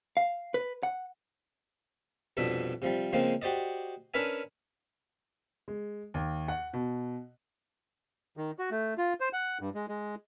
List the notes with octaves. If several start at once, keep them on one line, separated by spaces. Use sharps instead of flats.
F5
B4
F#5
C2 F2 B2 D4 E5
C3 F3 G3
C#3 F3 G#3 A#3 C4
F#4 G4 C5 D5 D#5
C#4 D4 A#4 B4 E5 G#5
G#3
D#2
F#5
B2
D#3
F#4
A3
F4
C5
F#5
G2
G#3
G#3